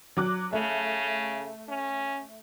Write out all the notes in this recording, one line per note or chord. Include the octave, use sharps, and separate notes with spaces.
F#3 D6 F#6
C#3 A3
C#4